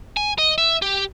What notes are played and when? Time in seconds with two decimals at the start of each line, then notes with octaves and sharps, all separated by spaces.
0.17 G#5
0.38 D#5
0.58 E5
0.82 G4